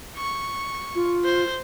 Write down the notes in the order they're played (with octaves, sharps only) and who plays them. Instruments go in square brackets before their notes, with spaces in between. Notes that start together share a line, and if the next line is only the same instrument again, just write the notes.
[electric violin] C#6
[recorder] F4
[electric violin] C5